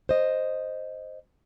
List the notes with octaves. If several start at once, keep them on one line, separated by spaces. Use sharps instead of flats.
C5 D#5